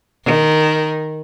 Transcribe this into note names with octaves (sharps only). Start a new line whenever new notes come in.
D#3